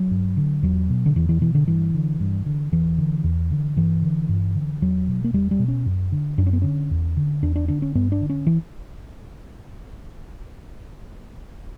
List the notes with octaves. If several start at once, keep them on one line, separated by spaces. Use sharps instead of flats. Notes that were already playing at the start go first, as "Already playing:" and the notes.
Already playing: F#3
G2
D3
E2 F#3
B2
D3
E2 E3
E3
B2 E3
D3
G2 E3
D3
G2
D3
E2 E3
D3
E2
D3
G2 E3
D3
G2
D3
E2 F#3
B2
A#3
E2 G3
G3
B2
C#4
F#2
D3
F#2 D4
C#4
B3
D3 C#4
E2
D3
E2 D4
D4
D3 D4
C#4
G2 B3
D4
D3
C#4
E3